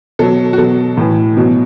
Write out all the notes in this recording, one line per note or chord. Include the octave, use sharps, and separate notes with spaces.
B2 F#3 A4
F#4
B2 F#3 A4
A2 E3
B2 F#3